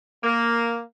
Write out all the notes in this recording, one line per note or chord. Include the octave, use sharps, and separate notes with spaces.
A#3